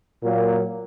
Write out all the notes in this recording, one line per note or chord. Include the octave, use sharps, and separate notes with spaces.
A#2 F#3 A#3